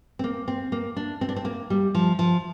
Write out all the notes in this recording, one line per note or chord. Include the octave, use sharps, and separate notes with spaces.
C4
A#3
C4
A#3
D4
C4
D4
C4
A#3
G3
F3
F3